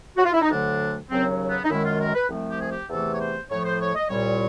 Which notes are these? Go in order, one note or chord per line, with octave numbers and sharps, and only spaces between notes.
F#4
F4
E4
D#4
D2 D3 F#3 A3 D4
D#2 C#3 F#3 C4
B3
D#4
F#2 D#3 G#3 E4
F4
A#4
B4
C2 C3 F3 A3
G4
G#4
G4
E2 C3 E3 A3 A4
C#5
C5
A2 F3 A3 C#5
C5
C#5
D#5
C2 A#2 G3 C#5